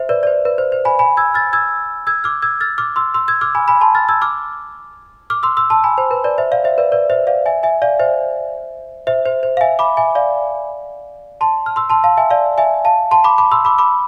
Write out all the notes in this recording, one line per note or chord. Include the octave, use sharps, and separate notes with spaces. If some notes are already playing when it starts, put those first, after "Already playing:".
Already playing: C5 E5
B4 D5
D5
C5
B4
C5
C5
G#5 B5
G#5 B5
E6 G#6
F6 A6
E6 G#6
E6 G#6
D6 F6
E6 G#6
F6 A6
D6 F6
C6 E6
C6 E6
E6 G#6
D6 F6
G#5 B5
G#5 B5
A5 C6
F6 A6
E6 G#6
D6 F6
D6 F6
C6 E6
C6 E6
A5 C6
G#5 B5
C5
B4
B4 D5
C5 E5
D5 F5
C5 E5
B4 D5
B4 D5
C5 E5
D5 F5
E5 G#5
E5 G#5
D5 F5
C5 E5
C5 E5
C5
C5
F5
E5 G#5
B5 D6
E5 G#5
D5 F5
A5 C6
F6
C6 E6
A5 C6
F5 A5
E5 G#5
D5 F5
E5 G#5
F5 A5
A5 C6
B5 D6
B5 D6
C6 E6
B5 D6
B5 D6